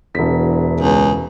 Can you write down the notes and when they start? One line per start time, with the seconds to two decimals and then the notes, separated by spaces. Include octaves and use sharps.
0.15 E1 E2 B6
0.80 C#2